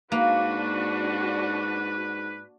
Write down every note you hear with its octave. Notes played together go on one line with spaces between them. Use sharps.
G#2 A#3 D4 F#4 B4